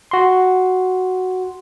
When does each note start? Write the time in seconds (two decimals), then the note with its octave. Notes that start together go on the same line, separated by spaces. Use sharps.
0.11 F#4 C6